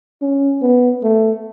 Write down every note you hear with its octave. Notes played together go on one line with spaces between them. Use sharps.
C#4
B3
A3